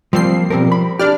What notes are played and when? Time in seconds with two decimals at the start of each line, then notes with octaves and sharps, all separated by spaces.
0.13 F3 G3 A#3 C4 C7
0.50 B2 F3 G3 C4 A#4
0.72 B5
0.99 D4 G4 D5 F6